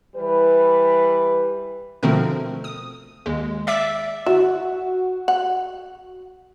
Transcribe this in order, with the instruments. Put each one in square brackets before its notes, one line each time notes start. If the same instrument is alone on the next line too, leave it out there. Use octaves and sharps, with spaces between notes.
[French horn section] E3 G3 B4
[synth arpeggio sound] B2 D3 F3 A3 C4 A#4
D#6
D#2 G#3
D5 E5 D6 B6
[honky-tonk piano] F#4 [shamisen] E5
[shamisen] F#5